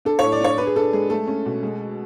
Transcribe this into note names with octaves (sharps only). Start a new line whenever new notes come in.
D4 A4
A2 C#5
D5
D4 C#5
D4 B4
G#4
D4 A4
G#3 G#4
A3 A4
C#4
B2
G#3